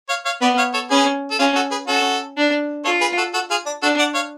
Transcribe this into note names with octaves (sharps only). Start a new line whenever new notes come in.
C#5 F5
C#5 F5
B3 B4 D5
C#5 F5
A4 C#5
C#4 G#4 B4
A4
C#4 F4 G#4
F#4 A4
G#4 B4
C#4 F#4 A4
D4
F4 A4 C#5
G#4 B4
F#4 A4
F#4 A4
F4 G#4
D4
D4 F#4 A4
D5 F#5
C#5 F5